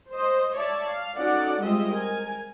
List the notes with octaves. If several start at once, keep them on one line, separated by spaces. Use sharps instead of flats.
C5 D#5
C#5 D5 E5 A5
F5
C#4 D#4 F#4 A4 D5 F#5
G3 G#3 C4 F4 D#5 E5
A#4 G#5